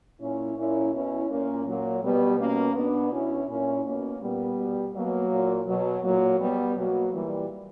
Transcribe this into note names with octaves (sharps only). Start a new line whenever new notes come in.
A#2 C#4 E4
A#2 C#4 E4
B2 C#4 E4
A#2 A#3 C#4
A#2 F#3 A#3
B2 G3 B3
B2 A#3 C#4
B2 B3 D4
B2 C#4 E4
A#2 C#4 E4
B2 A#3 C#4
A#2 G3 B3
B2
B2 F#3 A#3
A#2
B2 F#3
A#2 F#3 A#3
B2 G3 B3
B2 F#3 A#3
A#2 E3 G3